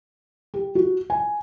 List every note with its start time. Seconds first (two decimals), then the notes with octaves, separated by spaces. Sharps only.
0.54 G4
0.75 F#4
1.10 G#5